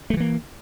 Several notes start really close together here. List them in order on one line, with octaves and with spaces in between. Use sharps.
A3 F3 E3 A#3